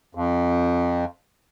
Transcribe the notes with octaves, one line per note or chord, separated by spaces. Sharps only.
F2